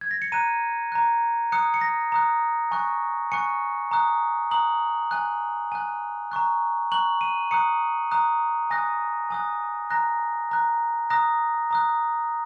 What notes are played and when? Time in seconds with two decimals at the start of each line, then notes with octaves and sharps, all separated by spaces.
0.01 G#6
0.11 A#6
0.22 C#7
0.32 A#5 F#6 D#7
0.92 A#5 F#6
1.52 A#5 D#6 F#6 C#7
1.74 C#7
1.81 A#6
2.12 A#5 D#6 F#6
2.71 G#5 C#6 F#6
3.32 G#5 C#6 F#6 C#7
3.91 A#5 D#6 F#6
4.51 A#5 D#6 F#6 F#7
5.11 G#5 F#6
5.72 G#5 F#6
6.31 A#5 C#6 F#6
6.92 A#5 C#6 F#6 F#7
7.21 D#7
7.51 A#5 D#6 F#6 C#7
8.11 A#5 D#6 F#6
8.70 G#5 D#6 F#6 A#6
9.30 G#5 D#6 F#6
9.90 A#5 F#6 A#6
10.51 A#5 F#6
11.10 A#5 D#6 F#6 A#6
11.71 A#5 D#6 F#6